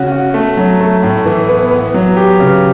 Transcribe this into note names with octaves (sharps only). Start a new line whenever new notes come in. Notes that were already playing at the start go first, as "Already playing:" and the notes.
Already playing: C#3 C#4 F#4
F#4
A3
F#3
A3
A2
E3
B3
B3
F#3
G4
C#3